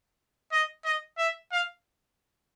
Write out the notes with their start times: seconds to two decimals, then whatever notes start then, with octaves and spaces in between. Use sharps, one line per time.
0.52 D#5
0.85 D#5
1.18 E5
1.52 F5